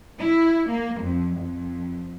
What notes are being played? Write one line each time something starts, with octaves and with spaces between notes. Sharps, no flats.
E4
A#3
F2
F2